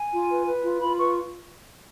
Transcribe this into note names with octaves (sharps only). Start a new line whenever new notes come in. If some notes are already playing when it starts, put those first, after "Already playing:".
Already playing: G#5
F4
B4
B4
F4
F4 B5
B4 C#6